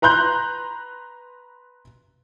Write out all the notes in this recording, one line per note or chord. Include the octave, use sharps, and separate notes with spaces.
B4 A#5 C6 F#6 G6